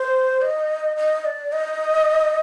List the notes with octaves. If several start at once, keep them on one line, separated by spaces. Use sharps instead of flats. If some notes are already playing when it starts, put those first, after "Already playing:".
Already playing: C5
D#5
D#5
D5
D#5